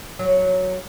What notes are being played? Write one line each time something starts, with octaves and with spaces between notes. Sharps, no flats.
F#3